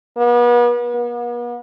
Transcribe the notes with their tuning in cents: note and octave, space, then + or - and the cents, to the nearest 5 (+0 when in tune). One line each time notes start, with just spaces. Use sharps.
B3 -40
B3 -45